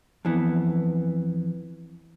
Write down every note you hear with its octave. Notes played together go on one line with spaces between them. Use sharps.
F2 E3 B3